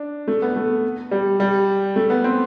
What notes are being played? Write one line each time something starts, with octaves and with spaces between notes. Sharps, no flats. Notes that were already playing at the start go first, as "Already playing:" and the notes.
Already playing: D4
A3
B3
A3
G3
G3
A3
B3
C4